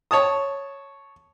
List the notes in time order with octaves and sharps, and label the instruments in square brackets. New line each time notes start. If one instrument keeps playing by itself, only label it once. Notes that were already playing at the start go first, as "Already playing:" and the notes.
[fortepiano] C#5 A5 D#6